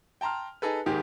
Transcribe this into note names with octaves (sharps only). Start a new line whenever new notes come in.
G5 A5 A#5 C6 F6
D#4 G#4 A4 B4
D#1 G#2 D#3 G4 G#4